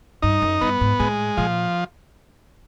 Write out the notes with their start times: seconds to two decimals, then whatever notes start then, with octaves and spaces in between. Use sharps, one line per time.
0.22 G2 D#4
0.42 F#2
0.61 G2 B3
0.81 G#2
1.00 A2 G#3
1.37 A#2 F3